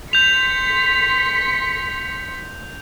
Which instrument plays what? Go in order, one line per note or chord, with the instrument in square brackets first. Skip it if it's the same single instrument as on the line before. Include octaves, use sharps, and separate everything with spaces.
[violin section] C6 B6 C#7 [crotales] G6 F7